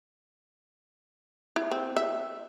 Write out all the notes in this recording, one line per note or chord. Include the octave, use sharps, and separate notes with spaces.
E4
C4
E5